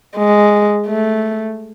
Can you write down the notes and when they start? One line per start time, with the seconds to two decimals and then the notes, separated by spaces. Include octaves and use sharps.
0.17 G#3
0.88 A3